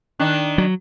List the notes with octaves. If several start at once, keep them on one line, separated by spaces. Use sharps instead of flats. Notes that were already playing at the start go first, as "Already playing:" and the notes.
D#3 D4
F#3